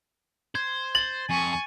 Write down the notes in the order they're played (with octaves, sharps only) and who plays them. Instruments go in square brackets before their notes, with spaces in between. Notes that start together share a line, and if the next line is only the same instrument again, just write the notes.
[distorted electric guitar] C5 [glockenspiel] G#6
[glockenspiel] A6 [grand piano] F#7
[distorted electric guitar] F2 [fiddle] G#5 C#6